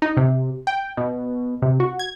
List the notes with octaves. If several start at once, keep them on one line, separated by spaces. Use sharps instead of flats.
D#4
C3
G5
B2
C3
F#4
G#6